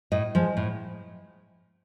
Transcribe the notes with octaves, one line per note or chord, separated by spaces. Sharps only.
A2 D#5
F3 G#3
A2